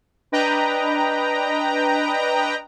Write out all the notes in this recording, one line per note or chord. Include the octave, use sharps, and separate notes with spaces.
D4 B4 D#5 G5 A#5